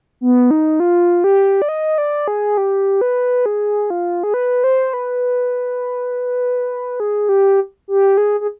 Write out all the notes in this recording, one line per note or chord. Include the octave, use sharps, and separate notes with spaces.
B3
D#4
F4
G4
D5
D#5
D5
G#4
G4
B4
G#4
F4
G#4
B4
C5
B4
G#4
G4
G4
G#4
G#4